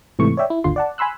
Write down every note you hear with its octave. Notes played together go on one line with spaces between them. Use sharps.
G#2 C3 E3 A3 C#6
C#5 D5 E5 G5
E4
G#1 D#2 D3 F4 C6
D5 F#5 A5
G#5 B5 C6 E6 F#6